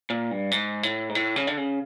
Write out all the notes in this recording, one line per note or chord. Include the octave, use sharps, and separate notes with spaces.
A#2
G2
G#2
A2
G#2
A2
C#3
D3
C#3